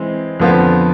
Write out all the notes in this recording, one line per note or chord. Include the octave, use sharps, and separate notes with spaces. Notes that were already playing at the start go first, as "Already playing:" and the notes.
Already playing: E3 G#3 C4
F2 D3 F3 B3 F4